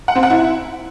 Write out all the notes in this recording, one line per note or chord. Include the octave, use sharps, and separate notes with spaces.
F#5
C4
F#5
E4